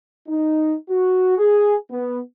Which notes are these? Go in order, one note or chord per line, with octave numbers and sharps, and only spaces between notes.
D#4
F#4
G#4
B3